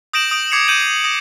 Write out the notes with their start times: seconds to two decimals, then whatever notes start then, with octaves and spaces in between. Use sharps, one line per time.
0.13 D#6 G6 A#6 D7 E7 F#7
0.31 D#6 G6 D7
0.51 D6 G#6 C7 C#7 F7 F#7
0.68 D6 G6 C#7 D#7 E7 F#7
1.04 D#6 A#6